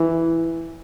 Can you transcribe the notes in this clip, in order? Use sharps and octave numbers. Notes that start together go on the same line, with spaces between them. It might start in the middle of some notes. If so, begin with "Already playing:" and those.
Already playing: E3